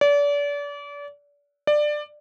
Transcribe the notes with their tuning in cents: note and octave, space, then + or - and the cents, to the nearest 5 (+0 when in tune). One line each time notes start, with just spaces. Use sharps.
D5 -35
D5 +15